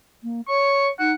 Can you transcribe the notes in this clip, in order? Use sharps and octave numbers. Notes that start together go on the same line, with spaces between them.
A#3
C#5 C#6
D#4 F#5